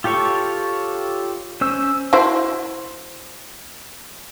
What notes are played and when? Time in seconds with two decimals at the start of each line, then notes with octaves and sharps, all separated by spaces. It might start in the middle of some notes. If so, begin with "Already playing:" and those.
0.04 F4 G4 A4 C#5 C#6
1.61 C#4 C5 E6
2.13 E4 F#4 C5